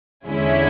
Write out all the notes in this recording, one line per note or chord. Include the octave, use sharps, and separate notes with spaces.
E2 D3 G#3 C#4 E4